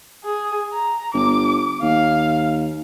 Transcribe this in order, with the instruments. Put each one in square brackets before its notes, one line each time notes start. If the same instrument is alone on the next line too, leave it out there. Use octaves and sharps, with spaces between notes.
[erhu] G#4
A#5
[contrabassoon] G1 [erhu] D6
[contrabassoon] D#2 [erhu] F5